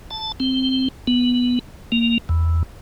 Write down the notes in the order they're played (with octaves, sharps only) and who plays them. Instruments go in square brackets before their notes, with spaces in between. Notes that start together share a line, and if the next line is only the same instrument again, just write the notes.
[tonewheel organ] A5
C4
B3
A#3
E2